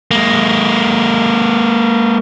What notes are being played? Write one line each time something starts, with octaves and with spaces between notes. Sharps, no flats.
G#3 A#3